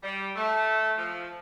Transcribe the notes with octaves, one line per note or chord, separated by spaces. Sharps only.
G3
A3
F3